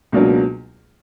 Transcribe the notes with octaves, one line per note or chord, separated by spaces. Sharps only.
C#2 B2 F#3 A#3 D4